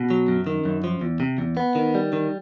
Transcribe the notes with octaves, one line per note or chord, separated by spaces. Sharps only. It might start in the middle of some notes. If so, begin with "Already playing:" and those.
Already playing: B2
F#3
F#2
D#3
F#2
F3
E2
C3
E2
B3
D#3
G3
D#3